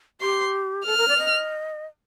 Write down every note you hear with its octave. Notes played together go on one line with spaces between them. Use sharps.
G4 C6
A4 F6
A#4
D5
D#5